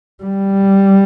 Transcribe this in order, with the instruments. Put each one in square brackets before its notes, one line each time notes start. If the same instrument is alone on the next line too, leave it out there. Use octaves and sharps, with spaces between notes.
[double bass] G3